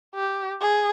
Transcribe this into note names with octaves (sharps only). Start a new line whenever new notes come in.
G4
G#4